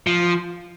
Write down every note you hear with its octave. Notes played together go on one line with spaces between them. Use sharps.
F3